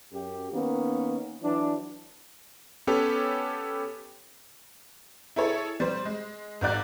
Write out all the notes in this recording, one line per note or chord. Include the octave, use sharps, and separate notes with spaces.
F#2 G4
D#3 A#3 B3 C#4
E3 F#3 D4
B3 C#4 G4 A4 B4 C#5
E4 G#4 A4 C#5
G3 C5
G#3
G#1 G#2 F#4 D5 F#6